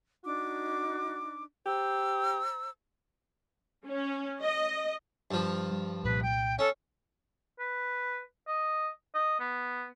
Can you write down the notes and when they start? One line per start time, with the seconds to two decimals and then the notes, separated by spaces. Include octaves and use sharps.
0.24 D4 D#4 F#4 D6
1.66 G4 C5 A#5 E6
3.87 C#4
4.42 D#5
5.31 G2 F3
5.71 G3
6.04 C2 A#2 B4
6.22 G5
6.59 C#4 A4
7.59 B4
8.48 D#5
9.14 D#5
9.40 B3